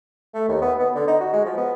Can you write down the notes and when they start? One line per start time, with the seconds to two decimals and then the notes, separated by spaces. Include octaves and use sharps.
0.34 A3
0.49 D#2
0.61 B3
0.79 B3
0.95 D3
1.07 D#4
1.20 F#4
1.33 G#3
1.45 F3
1.57 B3